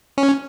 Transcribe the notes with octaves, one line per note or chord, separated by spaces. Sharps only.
C#4